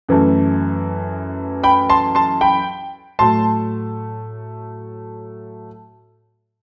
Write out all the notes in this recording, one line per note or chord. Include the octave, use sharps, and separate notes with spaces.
F#2 E3 A3
G5 B5
A5 C6
A5 C6
G5 B5
A2 F#3 A3 A5 C6